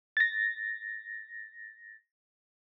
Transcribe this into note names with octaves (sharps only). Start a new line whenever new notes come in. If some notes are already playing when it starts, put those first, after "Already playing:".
A6 A#6